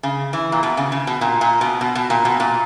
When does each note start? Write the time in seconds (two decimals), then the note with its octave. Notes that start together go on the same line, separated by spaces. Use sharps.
0.03 C#3
0.33 E3
0.52 A#2
0.63 B2
0.77 C#3
0.92 C#3
1.07 B2
1.21 A#2
1.41 A#2
1.61 B2
1.81 B2
1.95 B2
2.10 A#2
2.25 B2
2.40 A#2